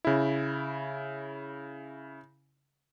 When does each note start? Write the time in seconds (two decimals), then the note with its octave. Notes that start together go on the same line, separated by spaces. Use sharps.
0.05 C#3 E4